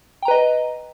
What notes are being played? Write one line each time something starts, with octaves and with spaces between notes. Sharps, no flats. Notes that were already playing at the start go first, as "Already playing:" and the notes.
B4 D#5 G5 A#5